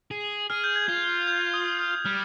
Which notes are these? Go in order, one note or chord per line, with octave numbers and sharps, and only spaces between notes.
G#4
G#4 F6
G6
G#6
F4
G6
D#6
D#6
G3 F6